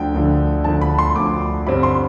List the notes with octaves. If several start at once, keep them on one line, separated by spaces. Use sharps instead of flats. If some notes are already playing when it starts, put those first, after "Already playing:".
Already playing: D2 D3 F3 G5
D2 D3 F3
D2 D3 F3 A5
B5
C6
D2 D3 F3 D6
G2 D3 G3 C4 B5
C6